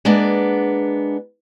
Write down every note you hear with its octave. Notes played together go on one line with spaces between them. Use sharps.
G#3 A#3 B3 D4